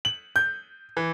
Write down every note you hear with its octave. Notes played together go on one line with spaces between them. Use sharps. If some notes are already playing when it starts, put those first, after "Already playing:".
F#7
G6
E3